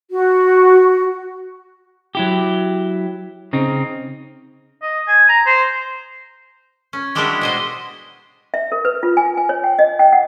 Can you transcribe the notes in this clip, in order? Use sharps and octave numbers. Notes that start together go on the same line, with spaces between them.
F#4
F#3 E4 G4
C#3 C4 D#4
D#5
G#5
A#5
C5
C#4
G3 G#3 D4 E4 F#4 G4
B2 C5 D#5
E5
A#4
B4
F4
G#5
G#5
C#5
G5
D#5
G5
F#5